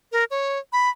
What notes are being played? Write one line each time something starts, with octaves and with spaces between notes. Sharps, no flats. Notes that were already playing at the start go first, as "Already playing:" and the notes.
A#4
C#5
B5